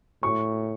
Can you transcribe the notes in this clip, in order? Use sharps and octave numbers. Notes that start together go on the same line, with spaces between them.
A2 C#6